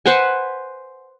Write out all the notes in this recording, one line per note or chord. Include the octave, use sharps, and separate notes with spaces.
B4 C5 F#5 G#5